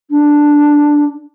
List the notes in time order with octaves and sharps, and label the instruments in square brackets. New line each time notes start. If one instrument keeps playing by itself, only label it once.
[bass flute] D4